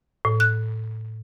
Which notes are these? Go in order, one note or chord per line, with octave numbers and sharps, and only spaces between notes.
A2
F#6